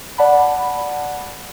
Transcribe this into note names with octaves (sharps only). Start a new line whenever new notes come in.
D5 F#5 A5 B5